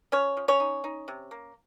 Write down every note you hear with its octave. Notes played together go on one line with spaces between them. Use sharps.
F3 C#4 C#5
F3
C#4 C#5
D#4
D#4
C3
A#3